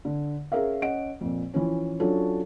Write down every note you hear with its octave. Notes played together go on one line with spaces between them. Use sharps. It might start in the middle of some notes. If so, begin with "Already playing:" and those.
D3
C#4 G#4 A#4 E5 F5
C#4 D#5 F#5 D7
F2 A#2
E3 F3 C#4
F#3 C#4 D4 F4 A4